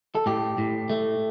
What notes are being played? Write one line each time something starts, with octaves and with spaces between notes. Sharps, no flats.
A4
A2 G4
A2
A3